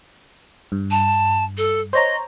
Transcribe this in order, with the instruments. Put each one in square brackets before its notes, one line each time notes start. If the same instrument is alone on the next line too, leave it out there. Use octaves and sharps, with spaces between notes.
[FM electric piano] G2
[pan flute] A5
A4
[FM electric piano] C5 C#5 A#5 [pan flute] D#5